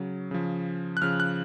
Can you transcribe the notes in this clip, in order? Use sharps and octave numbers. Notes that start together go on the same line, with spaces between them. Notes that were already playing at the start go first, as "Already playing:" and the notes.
Already playing: C#3 F#3
C#3 F3
F#6
C#3 F3 F6
F#6